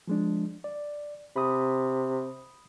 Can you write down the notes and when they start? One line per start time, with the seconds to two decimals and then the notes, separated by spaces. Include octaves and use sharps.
0.08 F3 G#3 D4
0.64 D5
1.36 C3 B5 D#6